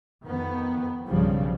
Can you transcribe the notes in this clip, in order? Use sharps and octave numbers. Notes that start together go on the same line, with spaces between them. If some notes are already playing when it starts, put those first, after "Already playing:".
F2 D#3 B3
B1 G2 C#3 F3 G3